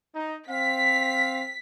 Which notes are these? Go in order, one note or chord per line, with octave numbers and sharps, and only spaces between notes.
D#4
C4 F5 B6